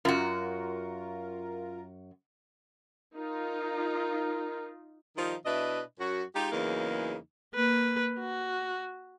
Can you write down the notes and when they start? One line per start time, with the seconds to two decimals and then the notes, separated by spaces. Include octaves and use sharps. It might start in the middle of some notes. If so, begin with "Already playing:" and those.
0.05 F#2 F4 F#4 A#4
3.15 D#4 F4 A#4
5.16 D#3 F3 G3 D#4
5.46 B2 D4 E4 B4 D#5 E5
6.00 F#2 F#4
6.35 G#3 D#4 F4 G4
6.52 E2 C#3 E3 F#3 A#3 D#4
7.55 A#3 B4
8.19 F#4